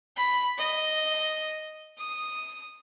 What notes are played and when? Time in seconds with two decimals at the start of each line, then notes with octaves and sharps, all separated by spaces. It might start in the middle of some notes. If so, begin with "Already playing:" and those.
0.17 B5
0.58 D#5
1.98 D#6